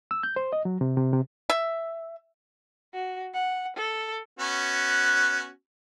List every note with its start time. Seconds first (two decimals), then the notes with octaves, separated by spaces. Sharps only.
0.11 E6
0.23 G6
0.36 C5
0.53 D#5
0.65 F#3
0.81 C3
0.97 C3
1.13 C3
1.50 E5
2.93 F#4
3.34 F#5
3.76 A4
4.39 B3 C#4 F#4